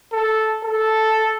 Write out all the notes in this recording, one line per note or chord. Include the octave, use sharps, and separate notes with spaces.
A4
A4